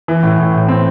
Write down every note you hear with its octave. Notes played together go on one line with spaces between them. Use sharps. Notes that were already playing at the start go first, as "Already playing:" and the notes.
E3
A2
A2
A2
C4